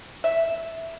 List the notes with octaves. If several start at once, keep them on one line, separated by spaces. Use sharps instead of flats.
E5